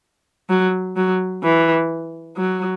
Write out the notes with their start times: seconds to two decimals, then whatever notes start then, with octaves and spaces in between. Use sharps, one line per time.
0.50 F#3
0.96 F#3
1.43 E3
2.37 F#3